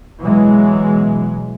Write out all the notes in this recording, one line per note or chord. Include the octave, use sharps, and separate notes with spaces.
B2 E3 F#3 G#3